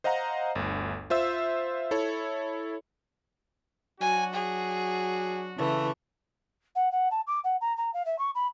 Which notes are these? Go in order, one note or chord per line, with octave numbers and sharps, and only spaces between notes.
C5 D#5 F5 F#5 A#5
G1 D2
F4 C5 E5 E6
E4 A4 C#5
F#3 D4 F#4 G#5
G#4
C#3 E3 A3
F#5
F#5
A5
D6
F#5
A#5
A#5
F5
E5
C#6
B5